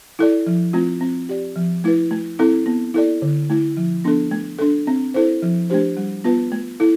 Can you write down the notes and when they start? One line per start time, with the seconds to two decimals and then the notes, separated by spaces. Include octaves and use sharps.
0.19 E4 A4 D5
0.47 F3
0.73 A3 C4 F4
1.01 C4
1.29 G4 D5
1.56 F3
1.84 A3 E4 B4
2.11 A3
2.39 C4 E4 A4
2.66 B3
2.94 E4 A4 D5
3.22 D3
3.50 A3 E4
3.77 F3
4.04 B3 D4 A4
4.31 A3
4.59 D4 A4
4.87 C4
5.14 E4 A4 C5
5.42 F3
5.70 A3 D4 G4 C5
5.97 G3
6.24 B3 F4 B4
6.52 A3
6.80 E4 A4